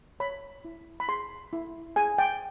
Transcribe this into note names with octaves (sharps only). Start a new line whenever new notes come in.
C#5 B5
E4
B5
G#4 C6
E4
G#4 G#5
G5